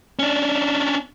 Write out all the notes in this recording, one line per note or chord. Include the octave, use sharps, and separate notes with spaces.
C#4 D4